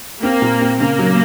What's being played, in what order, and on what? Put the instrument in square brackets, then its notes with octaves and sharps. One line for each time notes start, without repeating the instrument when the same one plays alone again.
[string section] A#3 [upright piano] C4
[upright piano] A#2
C4
[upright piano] C#3 [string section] A#3
[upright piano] F#3